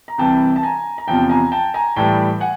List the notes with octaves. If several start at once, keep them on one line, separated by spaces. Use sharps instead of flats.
A#5
C2 C3 E3 G5 A5
A5
G#5 A#5
A#5
E2 C3 F3 G5 A5
G#5 A#5
G5 A5
G#5 A#5
A2 E3 G3 G5 A5
F#5 G#5